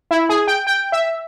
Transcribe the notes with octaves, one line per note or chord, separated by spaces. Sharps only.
E4
G#4
G5
G5
E5